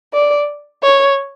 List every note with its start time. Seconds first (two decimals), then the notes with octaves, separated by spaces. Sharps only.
0.13 D5
0.83 C#5